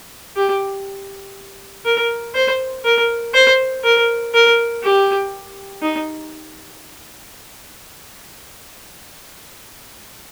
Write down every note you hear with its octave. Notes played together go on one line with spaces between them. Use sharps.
G4
A#4
C5
A#4
C5
A#4
A#4
G4
D#4